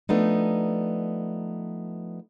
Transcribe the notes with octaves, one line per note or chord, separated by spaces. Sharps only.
F3 A3 B3 D4 D#4